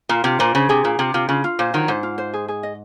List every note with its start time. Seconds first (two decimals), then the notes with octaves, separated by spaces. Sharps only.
0.09 A#2 F4
0.24 C3 F4
0.39 A#2 C5
0.55 C#3 C5
0.69 C3 G#4
0.84 A#2 F4
0.99 C3 F4
1.14 C3 F4
1.29 C#3 F4
1.44 F4
1.59 A#2 C5
1.73 D#3 F#3 F4
1.88 G#2 C5
2.03 F4
2.18 C5
2.34 G#4
2.48 G#4
2.63 D#5